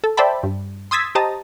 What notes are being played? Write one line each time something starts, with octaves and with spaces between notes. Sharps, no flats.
A4
C5 D5 E5 G5 A5 B5
G2
C6 D#6 E6 G#6 A6 B6
G4 C5 D#5 A5 A#5 D#6